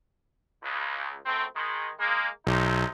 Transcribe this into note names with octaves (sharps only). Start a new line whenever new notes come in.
C#2
F#2 A3 C4
D#3 G#3
G#3 A#3
B1 C3 D#4